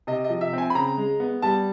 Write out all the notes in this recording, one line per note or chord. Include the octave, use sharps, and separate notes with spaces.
C3 D#5
D#5
F3
E5
C4 G#5
B5
C#3 A#5
G#3
B3
G3 A5